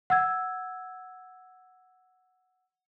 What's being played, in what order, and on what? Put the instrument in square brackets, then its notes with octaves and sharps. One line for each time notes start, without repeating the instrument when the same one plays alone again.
[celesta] F#5 E6 G#6